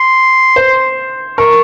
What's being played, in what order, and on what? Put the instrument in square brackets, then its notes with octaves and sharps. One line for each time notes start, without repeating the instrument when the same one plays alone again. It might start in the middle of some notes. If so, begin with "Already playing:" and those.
Already playing: [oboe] C6
[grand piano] C5
[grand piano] A#4 [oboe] C#6